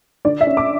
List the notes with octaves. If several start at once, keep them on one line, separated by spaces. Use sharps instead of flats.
D3 D5
E5
C#4
D6